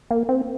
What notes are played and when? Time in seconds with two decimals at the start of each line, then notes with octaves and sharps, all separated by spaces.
0.11 A#3
0.29 C4